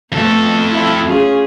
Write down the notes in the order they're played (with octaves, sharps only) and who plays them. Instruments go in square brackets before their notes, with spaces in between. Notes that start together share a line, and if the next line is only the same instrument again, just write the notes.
[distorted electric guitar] F2 A4 [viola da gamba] A3 B3
[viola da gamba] E4
C#4 F4 G#4